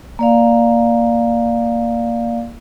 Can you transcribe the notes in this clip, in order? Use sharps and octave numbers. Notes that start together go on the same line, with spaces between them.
A#3 D5 F5